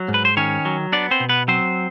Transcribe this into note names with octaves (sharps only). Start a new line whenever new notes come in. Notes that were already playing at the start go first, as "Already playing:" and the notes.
Already playing: F#3
G#2
B4
C5
D#3 C#4 C#5
F#3
B3 D4 D5
C4 C5
B2
B3 B4
F#3 C4 C5